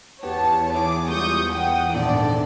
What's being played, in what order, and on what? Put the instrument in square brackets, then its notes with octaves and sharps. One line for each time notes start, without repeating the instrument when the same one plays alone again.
[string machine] E2 [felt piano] B3 G4 F#5 [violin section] C#5 A5
[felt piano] E4 C#5 [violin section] G#4 D6
[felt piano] G3 G#3 F4 [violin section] C#6 D#6 G6
[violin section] F#5 G5 D#6
[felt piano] A#1 G#2 D3 [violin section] D4 A4 D5